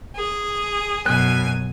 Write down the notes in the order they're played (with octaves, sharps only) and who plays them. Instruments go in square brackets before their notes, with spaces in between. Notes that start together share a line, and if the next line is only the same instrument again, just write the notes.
[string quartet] G#4
[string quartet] F#2 B2 G#5 [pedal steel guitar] F#6